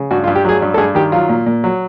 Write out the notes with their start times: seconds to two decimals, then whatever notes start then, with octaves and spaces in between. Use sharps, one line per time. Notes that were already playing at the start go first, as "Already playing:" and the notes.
Already playing: C#3
0.11 G2 F#4
0.24 F4
0.28 G2
0.35 G4
0.45 F#3 G#4
0.62 G2
0.74 A4
0.78 G2 G#4
0.95 D#3 G4
1.12 F#3 F4
1.29 A#2
1.46 A#2
1.64 F#3